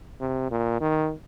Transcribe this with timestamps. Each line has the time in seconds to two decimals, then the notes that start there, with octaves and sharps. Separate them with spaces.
0.21 C3
0.51 A#2
0.81 D#3